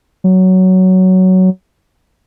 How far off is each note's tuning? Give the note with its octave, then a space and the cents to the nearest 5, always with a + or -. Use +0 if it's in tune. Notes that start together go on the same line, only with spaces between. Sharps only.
F#3 +10